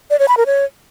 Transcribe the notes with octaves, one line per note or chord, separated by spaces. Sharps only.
D5
C#5
B5
A#4
C#5